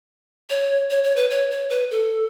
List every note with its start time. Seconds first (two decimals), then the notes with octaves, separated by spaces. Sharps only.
0.50 C#5
0.90 C#5
1.04 C#5
1.16 B4
1.31 C#5
1.51 C#5
1.70 B4
1.91 A4